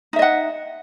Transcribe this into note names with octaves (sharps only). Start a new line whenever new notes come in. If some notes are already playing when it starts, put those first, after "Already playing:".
D#4 D#5 E5 F#5